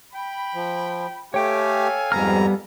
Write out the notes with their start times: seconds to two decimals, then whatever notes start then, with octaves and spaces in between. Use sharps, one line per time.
0.13 G5 B5
0.55 F3
1.34 A3 G4 A4 C#5 F5 G5 G#5
2.12 F2 G#2 G3 B3 A#5 F6